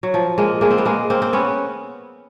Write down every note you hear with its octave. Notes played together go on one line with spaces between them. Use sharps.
F#3
F3
G#3 A#3
G#3 A#3
C4
B3
G#3 A#3
A#3 C4
C4
B3 C#4